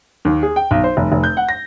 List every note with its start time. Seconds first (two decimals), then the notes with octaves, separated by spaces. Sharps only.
0.25 D#2
0.43 G#4
0.56 G5
0.71 B1
0.84 C5
0.97 F1
1.12 F1
1.24 G6
1.37 F#5
1.49 A#6